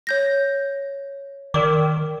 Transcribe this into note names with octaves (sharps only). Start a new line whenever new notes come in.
C#5 G6 A#6
D#3 A#4 D5 D6